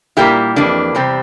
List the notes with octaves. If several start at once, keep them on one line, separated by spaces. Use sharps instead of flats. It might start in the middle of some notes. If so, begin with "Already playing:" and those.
A#2 G3 A#3 E4 G4
F2 E3 A#3 D4
E2 C3 G3 C4